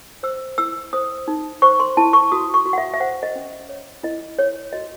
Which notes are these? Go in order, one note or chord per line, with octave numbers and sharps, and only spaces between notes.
C5 E6
E4 E6
C5 D#6
D#4
C5 C#6
C6
E4 A5
C#6
F#4 D#6
C#6
F#4
F#5
E5
E5
C5 F#5
D#5
C#4
C#5
E4 D#5
C#5
F#4 D#5